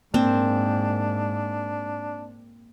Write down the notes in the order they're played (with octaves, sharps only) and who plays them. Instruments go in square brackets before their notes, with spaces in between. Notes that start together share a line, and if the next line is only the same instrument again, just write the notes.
[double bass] G#2 [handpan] A#3 [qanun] C4 [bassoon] D4